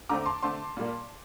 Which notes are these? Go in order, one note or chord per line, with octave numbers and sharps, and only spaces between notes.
D3 A3 C4 A#5 D6
A5 C6
D3 A3 C4 A5 C6
A#2 G3 A#3